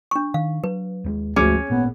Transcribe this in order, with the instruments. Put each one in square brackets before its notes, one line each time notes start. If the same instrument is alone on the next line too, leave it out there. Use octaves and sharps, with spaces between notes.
[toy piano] D4 C#6
[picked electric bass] D#3 [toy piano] F5
[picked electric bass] F#3 [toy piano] B4
[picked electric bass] D#2 F#3 G#3
[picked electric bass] G#1 F3 G#3 [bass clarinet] D2 [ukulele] C#4 [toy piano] G#4
[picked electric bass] G#1 A#2 A#3 [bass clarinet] B3